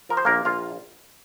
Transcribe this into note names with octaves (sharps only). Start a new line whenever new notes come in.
F3 A#4
C5
A#1 A#3 A#4
A#1 F4 F5